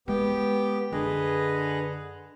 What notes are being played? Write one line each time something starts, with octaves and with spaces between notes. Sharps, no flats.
G#3 B3 G4 G5
F#2 D3 G#4 B4 D#5